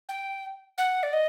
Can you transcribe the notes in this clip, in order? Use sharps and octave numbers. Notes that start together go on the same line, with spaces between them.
G5
F#5
D5
D#5